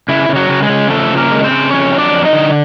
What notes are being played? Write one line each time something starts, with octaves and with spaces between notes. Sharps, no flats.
C#3 E4
C#3
F#3 F#4
C#3
G#3 G#4
C#3
F3 A3 A4
C#3
A#3 A#4
G#3
C4 C5
C#3
F2 C#4 C#5
F#3
D4 D5
F2
D#4 D#5
D3